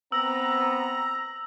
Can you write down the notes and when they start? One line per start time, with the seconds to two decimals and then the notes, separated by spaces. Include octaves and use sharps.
0.12 B3 C4 A#5 E6